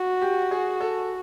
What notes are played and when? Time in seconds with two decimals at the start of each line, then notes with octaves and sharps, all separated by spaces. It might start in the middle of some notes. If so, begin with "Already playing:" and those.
Already playing: F#4
0.22 G4
0.51 G#4
0.81 A4